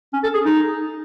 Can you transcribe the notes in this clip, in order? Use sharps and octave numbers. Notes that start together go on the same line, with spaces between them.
C#4
A4
G#4
D#4